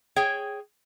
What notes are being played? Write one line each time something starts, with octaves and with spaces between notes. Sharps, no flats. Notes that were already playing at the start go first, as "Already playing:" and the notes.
G#4 C#5 G5